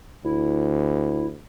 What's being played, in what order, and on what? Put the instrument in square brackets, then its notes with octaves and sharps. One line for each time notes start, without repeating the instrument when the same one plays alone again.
[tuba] D2 [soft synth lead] E4